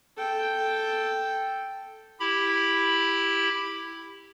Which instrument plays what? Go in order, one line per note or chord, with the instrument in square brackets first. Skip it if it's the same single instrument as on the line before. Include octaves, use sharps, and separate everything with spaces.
[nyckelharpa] A4 G5
[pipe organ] E4 G4 B5